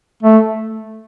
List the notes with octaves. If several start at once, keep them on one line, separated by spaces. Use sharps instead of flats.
A3